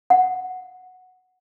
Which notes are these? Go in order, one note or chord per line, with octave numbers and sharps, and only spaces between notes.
F#5